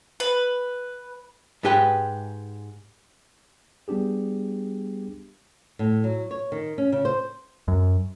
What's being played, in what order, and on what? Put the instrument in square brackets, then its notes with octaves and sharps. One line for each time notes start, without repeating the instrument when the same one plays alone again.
[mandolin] B4
[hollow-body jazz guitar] G#2 G#3 G4 B4 G5
[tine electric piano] G3 B3 D4 G4 G#4
[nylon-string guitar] A2
F#3
C#5
D#3
C#4
C#3
C5
[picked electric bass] F#2